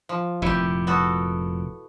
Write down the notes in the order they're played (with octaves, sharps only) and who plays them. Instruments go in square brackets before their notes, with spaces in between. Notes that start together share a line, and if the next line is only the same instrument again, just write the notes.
[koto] F3
[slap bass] F1 A#2 [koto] E4 G4
[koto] B3 F#4 A4